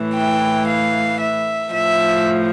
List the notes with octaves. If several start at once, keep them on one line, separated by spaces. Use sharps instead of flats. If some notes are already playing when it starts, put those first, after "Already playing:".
Already playing: A2 E3
G5
F5
E5
A2 F3 E5